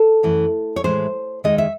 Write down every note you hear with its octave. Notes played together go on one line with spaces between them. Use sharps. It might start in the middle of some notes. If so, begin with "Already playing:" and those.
Already playing: A4
F#2 E3 A3
C#5
A2 E3 G#3 C5
D#2 D#3 G#3 D#5
E5